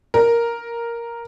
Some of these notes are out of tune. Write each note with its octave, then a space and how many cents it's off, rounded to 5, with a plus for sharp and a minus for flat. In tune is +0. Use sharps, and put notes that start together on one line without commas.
A#4 +5